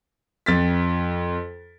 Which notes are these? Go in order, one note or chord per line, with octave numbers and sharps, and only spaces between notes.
F2 A6 B6